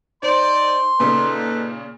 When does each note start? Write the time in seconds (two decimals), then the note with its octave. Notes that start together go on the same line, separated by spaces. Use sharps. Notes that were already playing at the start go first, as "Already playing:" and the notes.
0.23 D#4 C5 D5 C6
1.00 A#2 C#3 D#4 A4 B4